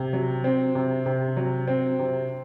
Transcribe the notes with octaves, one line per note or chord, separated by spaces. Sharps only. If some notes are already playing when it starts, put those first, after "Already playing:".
Already playing: C3
F#3
C4
C3
C3
F#3
C4
C3